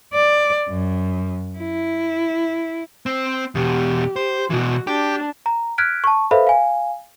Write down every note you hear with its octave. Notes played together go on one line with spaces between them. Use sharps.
D5
F#2
E4
C4
E2 B2 G4
C5
B2 E3 F#4
D4 G4
A#5
F6 F#6 G#6 B6 D7
A5 C#6
A4 B4 C5 E5 F5 B5
F5 G#5